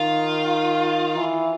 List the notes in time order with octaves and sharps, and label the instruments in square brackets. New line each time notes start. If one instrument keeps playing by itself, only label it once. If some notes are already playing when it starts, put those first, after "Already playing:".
Already playing: [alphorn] D#3 [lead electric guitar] F4
[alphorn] E3